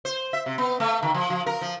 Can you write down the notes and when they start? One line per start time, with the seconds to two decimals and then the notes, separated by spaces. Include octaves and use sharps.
0.05 C5
0.33 E5
0.46 C3
0.58 B3
0.80 A3
1.03 D#3
1.14 F3
1.30 F3
1.46 A#4
1.61 F3